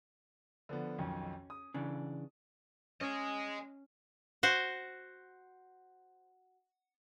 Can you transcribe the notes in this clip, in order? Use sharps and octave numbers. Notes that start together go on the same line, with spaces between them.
D3 F3 B3
B1 F2 D#3 C#4
D#6
C#3 E3 D4
C#4 D#5 G#5
F#4 C5